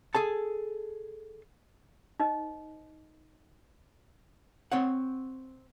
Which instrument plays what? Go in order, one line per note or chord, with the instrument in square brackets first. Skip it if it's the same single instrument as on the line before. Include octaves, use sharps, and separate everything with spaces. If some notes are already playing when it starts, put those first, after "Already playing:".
[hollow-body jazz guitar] G#4 A4 A5
[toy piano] D#4 C5 D#5
[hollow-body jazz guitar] C4 C#5 F#5